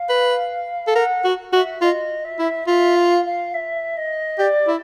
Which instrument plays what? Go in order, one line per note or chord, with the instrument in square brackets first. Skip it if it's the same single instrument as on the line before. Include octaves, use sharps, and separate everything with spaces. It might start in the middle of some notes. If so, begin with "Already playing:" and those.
Already playing: [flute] F5
[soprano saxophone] B4
A4
[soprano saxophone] A#4 [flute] F#5
[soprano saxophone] F#4
[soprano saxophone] F#4 [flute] E5
[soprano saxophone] F4 [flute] D#5
[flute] E5
[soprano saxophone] E4
[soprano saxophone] F4 [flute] E5
[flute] F5
F5
E5
D#5
[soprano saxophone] G4 [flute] D5
[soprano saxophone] E4